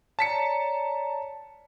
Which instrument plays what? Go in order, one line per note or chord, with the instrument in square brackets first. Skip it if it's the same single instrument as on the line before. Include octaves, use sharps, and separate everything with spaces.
[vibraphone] C#5 D5 A#5 [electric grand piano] A5 B6 C#7